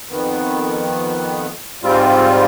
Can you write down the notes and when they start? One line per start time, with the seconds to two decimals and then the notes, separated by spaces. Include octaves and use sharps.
0.09 F2 D#3 B3
1.82 G#2 G3 C4 F4